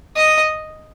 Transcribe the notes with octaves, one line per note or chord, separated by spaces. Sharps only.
D#5